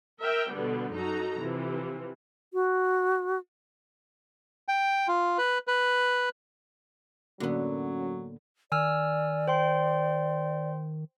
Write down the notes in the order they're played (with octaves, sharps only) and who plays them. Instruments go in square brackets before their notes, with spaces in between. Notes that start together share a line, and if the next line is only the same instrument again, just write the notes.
[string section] A#4 E5 G5
B2 D3 G3 B3
F#2 D#4 F#4 A4 A#5
C3 E3 F3
[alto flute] F#4
[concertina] G5
F4
B4
B4
[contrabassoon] F#2 [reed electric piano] A2 A#3 [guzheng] D3 B3 [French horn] F#3
[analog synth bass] D#3 [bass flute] D5 [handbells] G#5 E6 F6
[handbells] C5 G5 C6